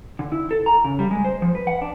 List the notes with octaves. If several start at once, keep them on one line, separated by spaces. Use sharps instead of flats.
D3
E4
A4
A#5
C#3
G3
G#3
C5
F3
B4
F#5
D4